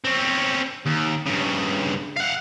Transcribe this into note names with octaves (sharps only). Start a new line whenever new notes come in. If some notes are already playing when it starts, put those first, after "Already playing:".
C4 C#4
D#2
G2 C#3
F5 F#5